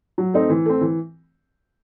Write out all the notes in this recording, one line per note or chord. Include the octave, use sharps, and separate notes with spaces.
F#3
A3 C4 D#4
E3
A3 C4
E3